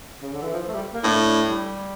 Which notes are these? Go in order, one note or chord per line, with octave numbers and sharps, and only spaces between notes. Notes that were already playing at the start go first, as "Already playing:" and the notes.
C#3
D3
E3
F3
A3
G3
A#3
A2 D4
D4
G3